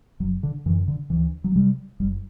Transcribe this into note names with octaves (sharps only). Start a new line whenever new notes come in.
F#1 F#3
D3
F#2 D3 E3
D3
D2 E3
F#3
C3 G3
F#1 G3